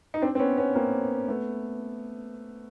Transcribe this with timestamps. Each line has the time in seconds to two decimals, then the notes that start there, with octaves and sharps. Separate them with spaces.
0.14 D#4
0.22 C4 D4
0.35 C4
0.39 B3 C#4
0.57 B3 C#4
0.75 A#3 C4
1.28 A3 B3